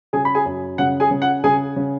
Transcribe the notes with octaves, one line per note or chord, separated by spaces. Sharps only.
C#3 G#4 G#5
B5
G#4 G#5
F#2
C#3 F#5
G#4 G#5
C#3
F#5
C#3 G#4 G#5
C#3